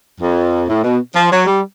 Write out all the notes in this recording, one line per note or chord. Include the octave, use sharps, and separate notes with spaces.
F2
A2
B2
F3
F#3
G3